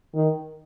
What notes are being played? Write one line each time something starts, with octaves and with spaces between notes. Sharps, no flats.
D#3